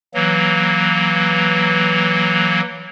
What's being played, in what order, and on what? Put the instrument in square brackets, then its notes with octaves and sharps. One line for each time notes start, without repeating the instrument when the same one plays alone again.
[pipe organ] E3 F#3 A#3